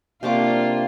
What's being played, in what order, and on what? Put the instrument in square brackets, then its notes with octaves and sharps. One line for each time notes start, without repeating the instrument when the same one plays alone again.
[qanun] C3 C#6 D6 [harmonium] A#3 [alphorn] D4 [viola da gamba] F4